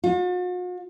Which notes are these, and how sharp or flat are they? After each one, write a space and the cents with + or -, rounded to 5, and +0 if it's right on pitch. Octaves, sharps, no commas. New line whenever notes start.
F#4 -45